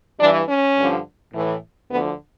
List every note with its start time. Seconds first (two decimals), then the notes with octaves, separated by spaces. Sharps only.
0.20 G2 E3 D4
0.49 C#4
0.77 G2 D3 F3
1.34 A2 E3
1.90 D2 D3 F3 B3